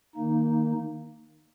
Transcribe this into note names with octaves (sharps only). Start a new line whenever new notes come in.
D#3 A#3 D#4